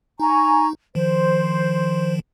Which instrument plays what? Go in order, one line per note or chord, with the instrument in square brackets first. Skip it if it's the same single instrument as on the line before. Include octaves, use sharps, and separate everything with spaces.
[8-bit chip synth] D#4 [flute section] G#5 A#5 C#6
[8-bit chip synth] D#3 F3 [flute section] C5